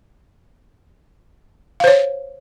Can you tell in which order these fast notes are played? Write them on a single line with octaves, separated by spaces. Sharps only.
F5 C5 C#5